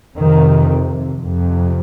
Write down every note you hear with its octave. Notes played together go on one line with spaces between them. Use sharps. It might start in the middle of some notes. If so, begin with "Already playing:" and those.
F2 C3 D#3
F2 C3